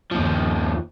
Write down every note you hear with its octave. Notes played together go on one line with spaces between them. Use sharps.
D#2 F3